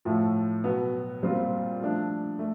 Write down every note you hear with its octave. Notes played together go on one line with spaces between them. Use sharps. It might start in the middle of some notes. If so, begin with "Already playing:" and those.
A2 F3 A3
B2 F#3 B3
A#2 G3 C4 F4
F3 A3 D4
A3